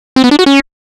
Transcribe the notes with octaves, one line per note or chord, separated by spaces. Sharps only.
C4
B3
D4
F#4
C#4